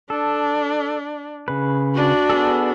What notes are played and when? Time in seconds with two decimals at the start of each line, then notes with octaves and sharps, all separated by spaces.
0.10 D4 A4
1.48 C#3 B4
1.95 D4 F#4
2.30 B3 G#4 A4